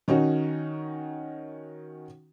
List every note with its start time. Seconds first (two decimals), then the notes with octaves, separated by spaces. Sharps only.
0.08 D#3 C#4 D#4 F#4